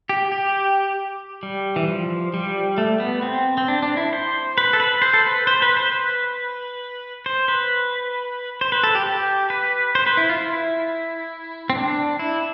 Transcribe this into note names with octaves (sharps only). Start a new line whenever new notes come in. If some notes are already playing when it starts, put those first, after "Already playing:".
G4
G4
G3
E3
F3
G3
A3
B3
C4
C4
D4
D4
E4
C5
B4
A4
B4
C5
A4
B4
C5
B4
C5
B4
C5
B4
C5
B4
A4
G4
G4
B4
C5
B4
E4
F4
E4
C4
D4
E4